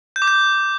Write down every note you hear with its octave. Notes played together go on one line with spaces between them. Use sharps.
G6
D6
G6